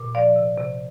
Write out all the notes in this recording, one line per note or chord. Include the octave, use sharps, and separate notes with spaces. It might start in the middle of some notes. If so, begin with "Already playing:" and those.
Already playing: A#2
F3 D5 F5
C3
C3